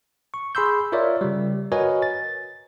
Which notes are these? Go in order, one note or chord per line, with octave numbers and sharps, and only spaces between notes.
C#6
G#4 B5 C6 E6 G6
F4 A#4 C#5 D5 E5
C#3 G3
F#4 A#4 B4 C#5 D#5 G#5
A6